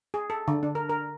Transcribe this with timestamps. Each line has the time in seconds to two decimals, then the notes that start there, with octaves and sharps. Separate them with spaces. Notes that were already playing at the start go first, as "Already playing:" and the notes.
0.14 G#4
0.30 A4
0.48 D3
0.63 D4
0.75 A#4
0.90 A#4